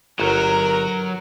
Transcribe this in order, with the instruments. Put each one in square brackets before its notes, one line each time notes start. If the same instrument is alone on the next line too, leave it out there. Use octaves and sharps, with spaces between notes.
[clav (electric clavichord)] G1 [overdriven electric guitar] F#3 [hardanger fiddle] A#4 [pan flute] A#5